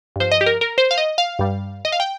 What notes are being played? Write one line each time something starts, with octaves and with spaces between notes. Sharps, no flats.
G2 F3 C5
D#5
G4
A#4
A#4
C5
F5
D#5
F5
G2 G3
D#5
F5
G5